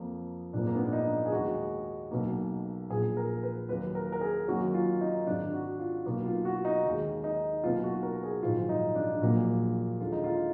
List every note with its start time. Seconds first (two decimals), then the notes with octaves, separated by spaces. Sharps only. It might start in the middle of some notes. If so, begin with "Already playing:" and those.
Already playing: F2 F3 A#3
0.53 A#1 G#2 F3 A#3 D4
0.67 A#3
0.76 B3
0.84 D4
0.93 D#4
1.26 G#4
1.32 D#2 D#3 G#3 F#4
2.11 B1 B2 A#3
2.90 A#1 A#2 F3 G#4
3.17 A#4
3.43 B4
3.69 D#2 D#3 F#3 A#3 B4
3.95 A#4
4.12 A#4
4.21 G#4
4.48 F#2 D#3 F#3 A#3 F#4
4.74 F4
5.01 D#4
5.27 G#1 G#2 D#3 D4
5.53 F#4
5.79 F4
6.06 B1 B2 A#3 B3
6.26 F4
6.45 F#4
6.65 D#4
6.85 D#2 D#3 G#3
7.24 D#4
7.64 B1 B2 A#3 F4
7.84 F#4
8.03 A#4
8.23 G#4
8.42 A#1 G#2 D#3 F#3 F4
8.69 D#4
8.95 D4
9.21 A#1 A#2 F#3 A#3
10.00 D#2 D3 G#3 F4
10.12 D#4
10.24 F4